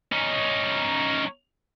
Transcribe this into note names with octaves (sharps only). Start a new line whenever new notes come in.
C#4 D#4